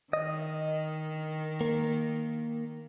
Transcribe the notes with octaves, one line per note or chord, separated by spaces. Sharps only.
D#3 D#5
A#3